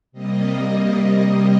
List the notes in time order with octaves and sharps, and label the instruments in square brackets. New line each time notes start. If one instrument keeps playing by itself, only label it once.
[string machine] C3 G3 A#3 D#5